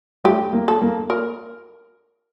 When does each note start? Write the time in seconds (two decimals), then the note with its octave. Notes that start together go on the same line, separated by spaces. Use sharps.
0.24 A3 G4
0.53 A#3
0.68 A4
0.82 A#3
1.10 A#4